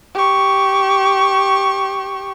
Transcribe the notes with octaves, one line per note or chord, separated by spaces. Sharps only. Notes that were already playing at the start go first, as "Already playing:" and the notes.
G4 C#6